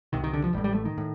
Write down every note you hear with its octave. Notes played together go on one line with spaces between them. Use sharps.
C2 C3 D#3
D#3
D3
F3
A1 A2 G3
G3
A3
D#3
A2